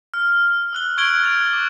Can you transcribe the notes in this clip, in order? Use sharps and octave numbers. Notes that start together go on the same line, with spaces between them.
F6
E6 F#6 G7
C#6 E6 G#6 D7 F#7 G7
F#6 A6 D7 F7
D6